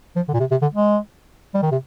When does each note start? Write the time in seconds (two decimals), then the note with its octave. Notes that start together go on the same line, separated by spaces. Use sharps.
0.16 F3
0.28 D3
0.34 A#2
0.40 C3
0.51 C3
0.62 D3
0.74 G#3
1.54 G3
1.62 D#3
1.72 C3